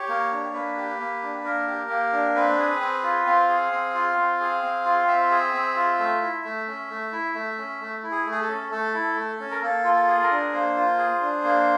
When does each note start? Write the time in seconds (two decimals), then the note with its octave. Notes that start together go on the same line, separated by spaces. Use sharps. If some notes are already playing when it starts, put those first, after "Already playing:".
Already playing: G4 C#5
0.09 A#3
0.32 D4
0.53 A#3 B4
0.77 G4
0.99 A#3
1.23 D4
1.44 A#3 A#4
1.67 G4
1.90 A#3
2.12 D4
2.35 C4 B4
2.58 G#4
2.81 C4
3.03 F4
3.26 C4 F5
3.49 G#4
3.72 C4
3.95 F4
4.17 C4
4.40 G#4
4.63 C4
4.85 F4
5.08 C4 E5
5.31 G#4
5.54 C4
5.76 F4
5.99 A3
6.22 E4
6.45 A3
6.67 C#4
6.90 A3
7.12 E4
7.35 A3
7.58 C#4
7.81 A3
8.03 E4
8.11 G#4
8.26 A3
8.32 G#4
8.41 A4
8.48 C#4
8.71 A3 A4
8.94 E4
9.16 A3
9.40 C#4
9.51 A#4
9.62 A#3 A4
9.84 F4
9.93 A4
10.07 G#4
10.23 A#4
10.31 D4
10.53 A#3 C5
10.76 F4
10.98 G#4
11.21 D4
11.44 A#3